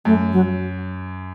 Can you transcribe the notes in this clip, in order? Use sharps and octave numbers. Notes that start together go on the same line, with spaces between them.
F#2 A3
F#3